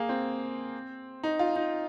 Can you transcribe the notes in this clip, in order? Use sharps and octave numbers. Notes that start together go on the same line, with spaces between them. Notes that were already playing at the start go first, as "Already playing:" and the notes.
Already playing: A#3 G#4
C4
D#4
F4
D#4